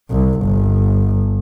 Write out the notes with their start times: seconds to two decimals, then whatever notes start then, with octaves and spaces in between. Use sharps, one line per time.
0.10 C2
0.42 G1